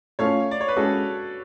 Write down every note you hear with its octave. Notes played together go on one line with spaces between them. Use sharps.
A3 C#4 F4 C#5 F5
D5
C#5
B4
G#3 C#4 F#4 G#4 A4